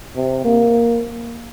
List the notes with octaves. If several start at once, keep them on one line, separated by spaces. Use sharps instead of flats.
C3
A#3